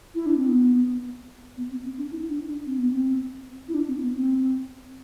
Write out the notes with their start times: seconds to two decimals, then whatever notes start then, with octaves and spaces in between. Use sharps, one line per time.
0.15 E4
0.26 D4
0.37 C4
0.48 B3
1.57 B3
1.71 C4
1.85 C4
1.98 D4
2.11 E4
2.29 D4
2.48 D4
2.66 C4
2.78 B3
2.91 C4
3.68 E4
3.74 D4
3.88 C4
4.02 B3
4.16 C4